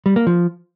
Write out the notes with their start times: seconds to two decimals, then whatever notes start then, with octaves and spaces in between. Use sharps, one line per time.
0.06 G3
0.16 A#3
0.27 F3